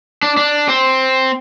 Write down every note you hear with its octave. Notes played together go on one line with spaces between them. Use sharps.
D4
D4
C4